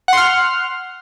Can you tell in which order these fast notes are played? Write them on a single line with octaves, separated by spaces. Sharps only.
F#5 C6 F6